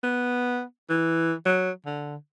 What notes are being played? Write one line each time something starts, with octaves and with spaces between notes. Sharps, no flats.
B3
E3
F#3
D3